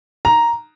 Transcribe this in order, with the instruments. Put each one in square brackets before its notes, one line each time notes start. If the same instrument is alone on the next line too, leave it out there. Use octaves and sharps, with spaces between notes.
[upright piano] A#5